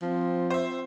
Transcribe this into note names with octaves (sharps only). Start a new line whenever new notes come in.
F3 C4
C5 E5